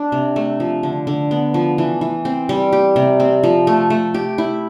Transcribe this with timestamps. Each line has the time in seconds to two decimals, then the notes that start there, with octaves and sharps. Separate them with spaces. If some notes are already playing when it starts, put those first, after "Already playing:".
Already playing: D4
0.12 C3
0.36 A3
0.60 F3
0.83 D3
1.07 D3
1.31 B3
1.54 F3
1.78 E3
2.01 E3
2.25 C4
2.49 G3
2.72 G4
2.96 C3
3.20 C4
3.43 F3
3.67 A3
3.90 A3
4.14 G4
4.38 E4